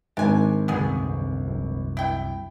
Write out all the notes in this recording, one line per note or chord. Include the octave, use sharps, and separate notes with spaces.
G#1 D4 G#5
C2 F#2 D3 B3 G#4
D1
E4 G5